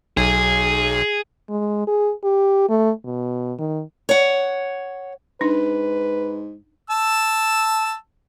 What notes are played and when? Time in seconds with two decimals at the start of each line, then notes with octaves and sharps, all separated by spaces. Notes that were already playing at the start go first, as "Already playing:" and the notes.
0.17 B1 G#4
1.49 G#3
1.87 G#4
2.24 G4
2.69 A3
3.05 B2
3.59 D#3
4.09 C#5 F#5
5.41 G#2 D4 D#4 B4
6.90 A5 E6